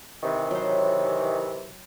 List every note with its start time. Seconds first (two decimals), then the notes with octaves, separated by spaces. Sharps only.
0.23 C3 D#3 E3
0.51 F#3 C5